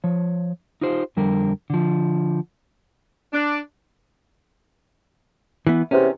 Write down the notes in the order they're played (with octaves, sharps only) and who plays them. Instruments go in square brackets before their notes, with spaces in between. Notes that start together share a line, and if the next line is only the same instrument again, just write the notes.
[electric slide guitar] F3 C#5
D#4 F4 G4 C5
F2 D3 G3 A#4
D3 F3
[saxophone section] D4
[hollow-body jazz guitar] E3 B3
[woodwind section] E2 C3 [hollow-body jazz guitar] C#4